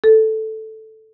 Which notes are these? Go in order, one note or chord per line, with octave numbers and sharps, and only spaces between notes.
A4